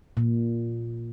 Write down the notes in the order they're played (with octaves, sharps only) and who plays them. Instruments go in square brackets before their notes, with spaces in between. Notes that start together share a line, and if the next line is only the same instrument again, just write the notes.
[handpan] A#2